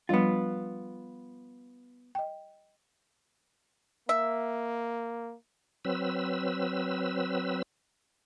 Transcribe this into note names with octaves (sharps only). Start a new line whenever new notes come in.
F3 G3 B3 D4 F4
D#5 G5
A#3 E5
F#3 C4 B4 E6